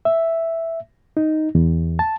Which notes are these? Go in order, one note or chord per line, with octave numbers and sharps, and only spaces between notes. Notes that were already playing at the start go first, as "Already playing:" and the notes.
E5
D#4
E2
A5